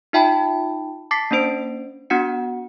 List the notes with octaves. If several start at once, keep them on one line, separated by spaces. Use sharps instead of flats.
D#4 F4 E5 G5 A5 B5
A5 D6 A6 B6 C7
A#3 C#4 D4 C5 D7
B3 D4 F#4 F#5 C#7